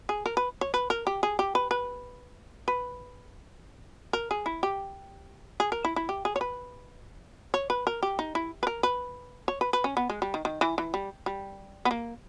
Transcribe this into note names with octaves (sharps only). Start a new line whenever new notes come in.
G#4
A#4
B4
C#5
B4
A#4
G4
G#4
G4
B4
B4
B4
A#4
G#4
E4
G4
G#4
A#4
E4
E4
G4
G#4
C#5
B4
C#5
B4
A#4
G4
D#4
E4
B4
A#4
B4
C#5
B4
B4
C#4
B3
G#3
G3
D#3
D#3
E3
E3
G3
G3
B3
A#3